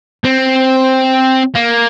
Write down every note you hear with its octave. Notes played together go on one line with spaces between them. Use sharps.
C4
A#3